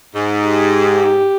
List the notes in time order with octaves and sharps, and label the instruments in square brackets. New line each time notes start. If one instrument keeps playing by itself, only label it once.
[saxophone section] G#2
[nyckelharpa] G4